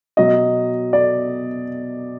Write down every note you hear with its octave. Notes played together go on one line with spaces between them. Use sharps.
B2 F#3 D#5
D5